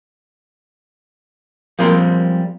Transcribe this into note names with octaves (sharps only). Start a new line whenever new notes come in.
F3 G3 G#3 A#3 C4 A#4